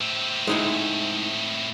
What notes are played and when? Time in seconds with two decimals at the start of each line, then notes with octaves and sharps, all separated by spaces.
0.01 A2 C4
0.47 G#3 D#4 E4